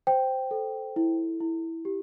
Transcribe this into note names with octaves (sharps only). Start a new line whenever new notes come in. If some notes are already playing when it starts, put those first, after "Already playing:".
C5 G5
A4
E4
E4
G4